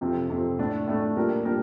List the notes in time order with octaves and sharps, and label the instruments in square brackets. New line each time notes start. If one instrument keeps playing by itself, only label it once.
[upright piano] F2 C3 F3
F2 C3 F3
A2 A3 D4
A2 A3 D4
A#2 G3 D4 G4 A#4
A#2 G3 D4 G4 A#4